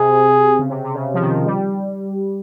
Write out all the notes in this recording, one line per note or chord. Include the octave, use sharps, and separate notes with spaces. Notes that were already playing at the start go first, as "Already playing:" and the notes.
Already playing: C3 G#4
C#3
C3
C3
C#3
F3
D#3
G3